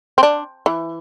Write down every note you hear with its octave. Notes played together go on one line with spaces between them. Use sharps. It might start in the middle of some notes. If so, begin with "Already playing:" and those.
C4
D4
E3